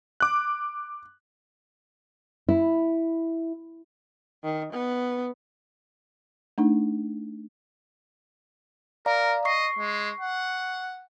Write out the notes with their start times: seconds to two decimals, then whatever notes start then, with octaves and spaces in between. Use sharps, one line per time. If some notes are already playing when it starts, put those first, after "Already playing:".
0.20 D6 F#6
2.49 E4
4.44 D#3
4.73 B3
6.58 A3 D4 D#4
9.06 A#4 D5 F5 A#5
9.45 D#5 C#6 C7
9.79 G#3
10.21 F#5